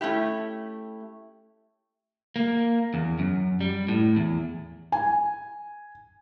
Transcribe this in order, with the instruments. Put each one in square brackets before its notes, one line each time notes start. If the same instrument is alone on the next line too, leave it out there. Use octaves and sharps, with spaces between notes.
[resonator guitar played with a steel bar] A3 C#4 E4 G4
[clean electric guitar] A#3
E2
F#2
G3
A2
E2
[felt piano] G#5